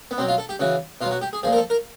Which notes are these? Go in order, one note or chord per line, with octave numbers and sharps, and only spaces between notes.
B3
B2 F#3 C4
F4
A4
G4
C#3 E3 F#4
B2 F#3 F4
F#4
G4
G#4
A#2 F3 G#4
A#4
A4
A#4